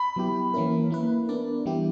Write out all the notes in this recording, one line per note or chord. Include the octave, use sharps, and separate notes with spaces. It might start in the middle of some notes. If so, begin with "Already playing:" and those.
Already playing: B5
F#3 B3 E4 G4
E3 A#3 C#4 E4 A#4
A#3 E4 B4
B3 D4 A#4 D5
E3 G3 B3 E4 G4